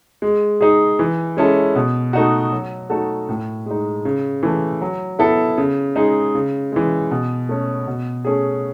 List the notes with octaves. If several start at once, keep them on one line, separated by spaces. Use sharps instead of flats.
G#3
D#4 G#4
E3
G#3 C#4 E4 A4
B2
A3 D#4 F#4
F#3
A3 D#4 F#4 A4
A2
G#3 D#4
C#3
E3 A3
F#3
B3 E4 A4
C#3
G#3 D#4 G#4
C#3
E3 G#3
B2
A3 C#4
B2
A3 C#4 G#4